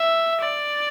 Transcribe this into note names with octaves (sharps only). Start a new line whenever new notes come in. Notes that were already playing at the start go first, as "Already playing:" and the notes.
Already playing: E5
D5